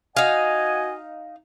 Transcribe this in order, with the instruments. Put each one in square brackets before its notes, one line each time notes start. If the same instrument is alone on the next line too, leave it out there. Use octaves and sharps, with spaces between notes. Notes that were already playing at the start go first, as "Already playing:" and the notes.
[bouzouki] D#4 F5 [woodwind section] F#4 F#5 G#5 [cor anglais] D#5